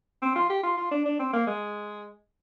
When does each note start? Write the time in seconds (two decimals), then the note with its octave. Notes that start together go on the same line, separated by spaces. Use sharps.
0.22 C4
0.36 F4
0.50 G4
0.63 F4
0.77 F4
0.91 D4
1.05 D4
1.19 C4
1.33 A#3
1.47 G#3